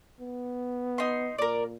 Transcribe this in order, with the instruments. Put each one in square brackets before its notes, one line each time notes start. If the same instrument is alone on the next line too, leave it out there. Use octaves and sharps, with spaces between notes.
[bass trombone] B3
[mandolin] D#4 C6
[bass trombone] A#2 [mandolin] A#4 D5